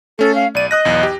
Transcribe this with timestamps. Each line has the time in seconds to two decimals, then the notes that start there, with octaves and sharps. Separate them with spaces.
0.19 A3 C#4 A4
0.35 F5
0.55 B1 D5 D#7
0.71 D#5 D#6 F#6 A#6
0.85 B1 E2
1.03 G4